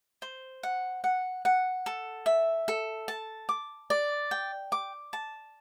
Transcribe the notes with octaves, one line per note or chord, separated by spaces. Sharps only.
C5
F#5
F#5
F#5
A4
E5
A4
A5
D6
D5
G5
D6
A5